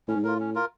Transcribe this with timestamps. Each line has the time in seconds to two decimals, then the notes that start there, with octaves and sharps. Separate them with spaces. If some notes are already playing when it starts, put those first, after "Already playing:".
0.08 A2 C#4
0.15 G#2
0.24 A2 F4 A#4
0.40 C#4
0.55 F4 A#4